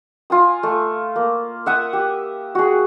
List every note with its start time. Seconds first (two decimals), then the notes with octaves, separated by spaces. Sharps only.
0.30 F4 G#5 D#6
0.63 A3
1.16 A#3
1.66 E5 F#5 D#6
1.93 G4
2.55 F#4 G#4